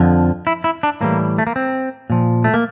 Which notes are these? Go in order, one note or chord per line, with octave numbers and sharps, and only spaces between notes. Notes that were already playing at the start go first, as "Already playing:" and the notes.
Already playing: F2 D3 F3
E4
E4
D4
A2 E3 G3 A#3
A3
A#3
C4
A#2 F3
A3
A#3